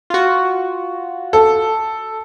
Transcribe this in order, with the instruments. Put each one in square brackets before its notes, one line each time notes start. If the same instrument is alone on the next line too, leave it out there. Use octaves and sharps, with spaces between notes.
[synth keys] F4 F#4
[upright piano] A4